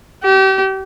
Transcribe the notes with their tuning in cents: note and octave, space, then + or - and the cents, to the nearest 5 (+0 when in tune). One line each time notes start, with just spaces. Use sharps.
G4 -35